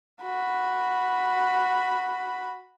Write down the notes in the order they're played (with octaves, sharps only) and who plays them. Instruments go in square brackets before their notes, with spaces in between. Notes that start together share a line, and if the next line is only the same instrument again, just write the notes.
[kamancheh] F#4 B5